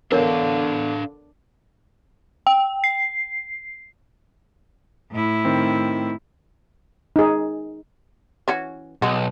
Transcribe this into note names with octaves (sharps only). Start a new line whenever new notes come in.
E2 D3 D4 A#4 C#5 F5
G5
C7
A2 E4
D#3 C4
D#4 G#4
E3 C#4 F#4
B1 G#3 F#4